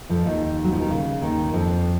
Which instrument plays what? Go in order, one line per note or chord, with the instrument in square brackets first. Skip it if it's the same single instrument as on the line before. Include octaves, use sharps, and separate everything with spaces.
[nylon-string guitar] F2 F3
D#2 D#3
F#3
F3
D#3
C#3
D#2 D#3
F2 F3